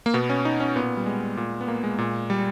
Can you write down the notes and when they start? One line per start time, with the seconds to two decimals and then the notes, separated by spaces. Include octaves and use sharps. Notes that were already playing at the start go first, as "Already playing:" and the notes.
0.06 A#3
0.14 B2 B3
0.30 C#4
0.45 D#4
0.60 C#4
0.76 A#2 B3
0.97 G3
1.06 G#3
1.37 A#2
1.61 B3
1.68 A#3
1.84 G#3
1.98 A#2
2.30 G3